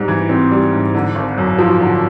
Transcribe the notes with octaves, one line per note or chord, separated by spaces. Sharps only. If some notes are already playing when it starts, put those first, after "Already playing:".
Already playing: G#2 G3
E3
C4
G3
G#2
D3
G#1
F#2
F3
D3